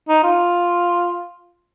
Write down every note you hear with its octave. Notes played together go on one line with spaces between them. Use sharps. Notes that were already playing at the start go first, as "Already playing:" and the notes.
D#4
F4